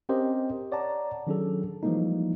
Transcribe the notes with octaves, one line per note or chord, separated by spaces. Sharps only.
C4 C#4 G4 A#4 C5 D#5
C#5 D5 F#5 A5 A#5
D#3 F#3 C#4 D4 G#4 A4
E3 F3 G3 G#3 A#3 D#4